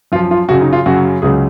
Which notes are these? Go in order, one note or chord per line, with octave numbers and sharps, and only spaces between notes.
F#2 F3 F4
F4
F#2 C#3 F#3 F#4
D#4
F4
F#2 C#3 F#3 F#4
C#2 C#3 F#3 G#4